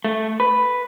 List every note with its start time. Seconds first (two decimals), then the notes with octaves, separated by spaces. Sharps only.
0.04 A3
0.40 B4